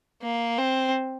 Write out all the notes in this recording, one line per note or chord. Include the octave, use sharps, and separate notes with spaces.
A#3
C4